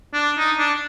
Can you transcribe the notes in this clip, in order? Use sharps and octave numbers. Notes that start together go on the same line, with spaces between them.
D4
D#4
D4